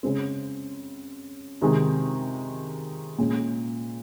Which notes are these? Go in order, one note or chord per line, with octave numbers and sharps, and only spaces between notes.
C#3 G#3 C4
C3 D#3 G#3
A#2 G#3 C#4